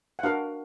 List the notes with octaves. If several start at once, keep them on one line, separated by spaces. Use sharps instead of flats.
F#5
D4 F#4 A#4 F5